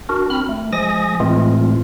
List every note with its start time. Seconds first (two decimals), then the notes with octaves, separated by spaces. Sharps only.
0.09 D4 F#4 A#4
0.30 C4 B5 F6
0.49 A3
0.73 F3 G#3 G#5 D#6 A#6
1.20 A2 E3 G#3 A3 C4 F4